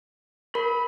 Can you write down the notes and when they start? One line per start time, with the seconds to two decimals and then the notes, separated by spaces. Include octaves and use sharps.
0.55 A#4 B5